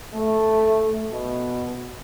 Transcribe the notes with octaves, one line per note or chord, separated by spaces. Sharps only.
A3
B2